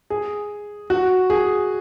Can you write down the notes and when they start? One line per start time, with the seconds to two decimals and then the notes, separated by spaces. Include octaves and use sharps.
0.10 G#4
0.90 F#4
1.30 G#4